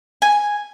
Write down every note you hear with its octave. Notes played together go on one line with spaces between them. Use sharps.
G#5